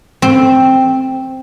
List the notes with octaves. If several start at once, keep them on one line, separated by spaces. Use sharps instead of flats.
C4